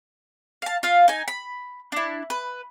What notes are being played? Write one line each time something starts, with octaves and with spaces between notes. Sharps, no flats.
F5 A5
F4 F5
D#4 G#5
B5
D4 E4
B4